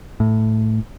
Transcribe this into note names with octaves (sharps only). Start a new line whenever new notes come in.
A2